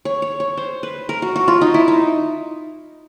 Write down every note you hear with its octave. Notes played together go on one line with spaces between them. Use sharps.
C#5
C#5
C#5
C5
B4
A#4
F#4
F#4
F4
D#4
E4
D#4